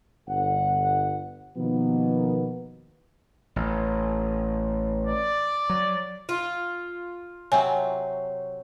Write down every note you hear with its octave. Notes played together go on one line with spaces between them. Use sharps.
G1 F#5
B2 D#3 F3 A#3 B3
A1
D5
F#3
F4
C3 F#3 C4 C#5 G#5